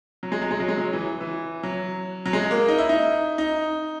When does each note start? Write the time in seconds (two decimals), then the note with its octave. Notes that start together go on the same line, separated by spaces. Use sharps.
0.23 F#3
0.32 G#3
0.41 F#3
0.51 G#3
0.60 F#3
0.68 G#3
0.78 F#3
0.93 E3
1.20 E3
1.63 F#3
2.26 F#3
2.33 G#3
2.51 A#3
2.68 D#4
2.78 E4
2.89 D#4
3.38 D#4